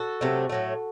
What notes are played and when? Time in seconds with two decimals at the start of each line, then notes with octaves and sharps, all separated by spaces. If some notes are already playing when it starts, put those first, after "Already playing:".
Already playing: F#4 A4
0.21 C3 F#3 A3
0.49 A2 F#3 A3